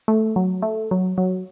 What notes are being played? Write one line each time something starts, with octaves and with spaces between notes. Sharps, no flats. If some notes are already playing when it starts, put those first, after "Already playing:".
A3
F#3
A3
F#3
F#3